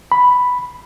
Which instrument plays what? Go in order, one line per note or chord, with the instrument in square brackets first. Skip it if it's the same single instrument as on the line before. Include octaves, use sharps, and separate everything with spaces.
[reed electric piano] B5